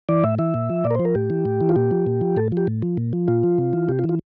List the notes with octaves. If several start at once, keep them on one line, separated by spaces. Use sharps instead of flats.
E3 D5
A2 E5
E3 E5
A#2
F3
A#2 D5
A#4
F3 C5
A#4
A2 G4
E3
A2
E3
F4
A#2 G4
F3
A#2
F3
A2 A4
F3 G4
A2
F3
A#2
F3
A#2 F4
F3
C3
E3
C3 G4
F4
E3
F4